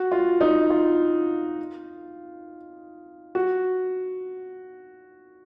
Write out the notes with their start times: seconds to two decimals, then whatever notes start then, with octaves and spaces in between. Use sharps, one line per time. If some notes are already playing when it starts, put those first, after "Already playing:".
Already playing: F#4
0.12 F4
0.41 D#4
0.70 F4
3.35 F#4